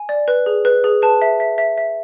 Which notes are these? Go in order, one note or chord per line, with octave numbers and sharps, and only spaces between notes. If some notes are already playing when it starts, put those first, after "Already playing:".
Already playing: G#5
D5
B4
G#4
B4
G#4
B4 A5
E5
E5
E5
E5